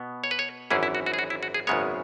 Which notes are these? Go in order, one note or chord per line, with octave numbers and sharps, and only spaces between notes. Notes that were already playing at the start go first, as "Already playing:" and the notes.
Already playing: B2 B3
C#5
B4
C#5
G#1 F#2 E3 C#4 E4 G#4
E4
F#4
F#4
G#4
F#4
E4
F#4
G#4
G#1 F#2 C#3 G#3 B3 C#5